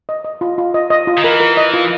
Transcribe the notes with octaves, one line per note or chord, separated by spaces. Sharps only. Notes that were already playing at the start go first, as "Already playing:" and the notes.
D#5
D#5
F4
F4
D#5
D#5
F4
D#3
E3 A#4
A#4
D#5
F4